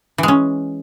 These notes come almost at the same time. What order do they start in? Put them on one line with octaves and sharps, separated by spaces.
E3 G#3 C#4